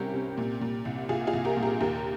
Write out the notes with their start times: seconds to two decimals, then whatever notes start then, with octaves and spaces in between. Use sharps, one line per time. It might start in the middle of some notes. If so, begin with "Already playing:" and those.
Already playing: C2 G3 C4 C#4 G4 A#4
0.14 C3
0.38 A#2
0.61 A#2
0.85 C2
1.09 C2 F4 G#4
1.27 F4 G#4
1.33 C2
1.45 G4 A#4
1.57 A#2
1.63 G4 A#4
1.80 D#2 G4 A#4